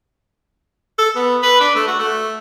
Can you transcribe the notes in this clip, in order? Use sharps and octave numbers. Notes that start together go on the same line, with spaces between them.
A4
B3
B4
D4
A3
F#4
A3